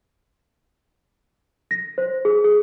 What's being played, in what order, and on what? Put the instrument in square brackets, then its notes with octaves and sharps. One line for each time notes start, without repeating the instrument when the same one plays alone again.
[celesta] A#6
C5
G#4
G#4